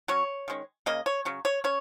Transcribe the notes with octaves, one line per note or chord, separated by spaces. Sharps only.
F#3 C#4 C#5
D#3 G#3 C#4
C#3 A#3 D#5
C#5
C#3 F#3 C#4
C#5
C#4 C#5